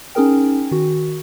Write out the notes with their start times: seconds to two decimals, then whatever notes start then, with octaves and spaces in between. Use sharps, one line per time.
0.15 C#4 D#4 G#4 A#4 G5
0.71 D#3 F#4